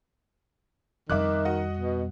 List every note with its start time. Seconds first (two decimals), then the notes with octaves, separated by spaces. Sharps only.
1.09 F2 D#3 G3 E5 D6 F#6
1.45 F#4 D#5 F#5
1.77 B2